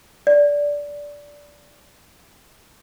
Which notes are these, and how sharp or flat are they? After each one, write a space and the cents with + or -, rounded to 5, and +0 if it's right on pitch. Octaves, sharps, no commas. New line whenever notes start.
D5 -15